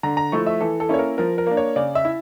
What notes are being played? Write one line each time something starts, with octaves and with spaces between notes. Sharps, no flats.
D3 A#5
A#5
F3 A3 E4 C#6
E5
E3 A4
A4
A#3 C#4 E4 C#5
A#4
F3 A#4
A#4
A#3 D4
C#5
C#3 D5
E5
E4